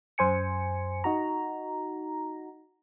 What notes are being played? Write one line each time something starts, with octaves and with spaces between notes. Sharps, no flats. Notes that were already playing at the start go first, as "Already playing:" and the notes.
F#2 C5 G#5 C#7
D#4 F#4 A#5